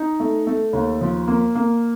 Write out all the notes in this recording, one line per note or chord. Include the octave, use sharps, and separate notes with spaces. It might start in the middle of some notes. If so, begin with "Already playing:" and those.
Already playing: D#4
A3
A3
D#2
F3
A#3
A#3